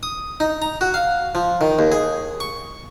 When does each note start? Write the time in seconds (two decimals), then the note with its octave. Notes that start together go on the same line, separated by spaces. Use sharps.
0.03 D#6
0.40 D#4
0.62 A#5
0.81 F#4
0.94 F5
1.35 F3
1.61 D#3
1.79 D#2
1.92 G#4
2.40 C#6